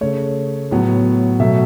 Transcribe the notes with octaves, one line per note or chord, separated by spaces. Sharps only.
C#3 A3 C#5
A2 F#3 B3
B2 F#3 A3 E5